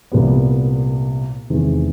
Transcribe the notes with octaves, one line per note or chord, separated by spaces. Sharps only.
C2 A#2 G3 B3
E2 C3 D#3 G#3